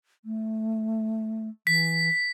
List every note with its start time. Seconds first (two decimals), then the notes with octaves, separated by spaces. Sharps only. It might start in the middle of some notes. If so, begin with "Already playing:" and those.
0.25 A3
1.67 E3 B6